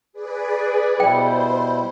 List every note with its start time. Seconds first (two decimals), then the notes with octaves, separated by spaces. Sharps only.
0.13 G#4 B4 D5
1.00 B2 G3 E4 C5 G5